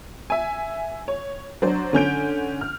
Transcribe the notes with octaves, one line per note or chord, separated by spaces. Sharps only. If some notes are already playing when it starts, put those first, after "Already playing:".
E5 G#5
C#5
F#3 D4 C5
D3 C#4 G6 D7
F6